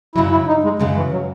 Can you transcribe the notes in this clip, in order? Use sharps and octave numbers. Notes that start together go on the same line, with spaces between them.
F#2 C#3 F#3 E4
E4
D#4
G#3
F#2 C#3 F#3 G#3
E3
F#3